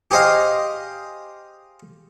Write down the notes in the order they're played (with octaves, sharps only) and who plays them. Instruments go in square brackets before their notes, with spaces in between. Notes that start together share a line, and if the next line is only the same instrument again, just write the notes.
[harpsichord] G4 G#4 C5 D#5 F5 D#6